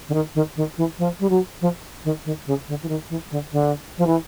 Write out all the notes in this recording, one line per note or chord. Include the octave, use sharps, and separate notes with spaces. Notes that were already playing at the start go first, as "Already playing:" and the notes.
D3
D#3
D#3
D#3
E3
F3
G3
F#3
F3
D#3
D#3
C#3
D3
E3
D#3
E3
D3
D3
F3
E3